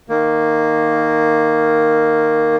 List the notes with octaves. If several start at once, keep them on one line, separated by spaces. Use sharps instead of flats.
D#3 A#3